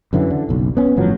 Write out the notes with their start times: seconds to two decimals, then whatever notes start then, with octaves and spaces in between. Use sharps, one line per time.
0.13 F#2 D3 E3 F#3
0.30 D3
0.49 F#1 B1
0.77 B3 C#4
0.96 G1 A2 F3 F#3